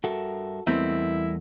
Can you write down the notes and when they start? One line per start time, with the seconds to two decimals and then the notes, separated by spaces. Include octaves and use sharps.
0.04 G2 F#4 A4 A#4 E5
0.67 E2 G3 A3 B3 C4 E4 A#4 D#5